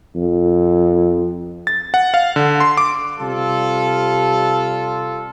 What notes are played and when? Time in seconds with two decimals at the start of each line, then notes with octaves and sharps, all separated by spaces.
0.16 F2
1.67 A6
1.94 F#5
2.14 F5
2.36 D3
2.60 C6
2.77 D6
3.20 C3 G3 F4 A4